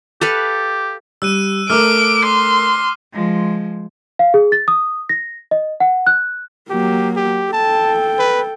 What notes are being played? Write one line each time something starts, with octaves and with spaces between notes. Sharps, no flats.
G4 A4 B4 F5
G3 E6 F#6 D#7
A3 A#4 D6 E6 F6 D7
C6 D6
F3 G#3
F5
G#4
A6
D#6
A#6
D#5
F#5
F#6
F#3 A#3 G4
G4
A4 G5 A5
B4